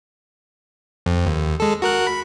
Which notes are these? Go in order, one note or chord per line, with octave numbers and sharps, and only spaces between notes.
F2
D#2
G#3 A4
F#4 A#4 F#6
B5